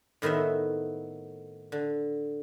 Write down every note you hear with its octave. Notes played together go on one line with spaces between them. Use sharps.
A2 D#3 B3 C4 E5
D3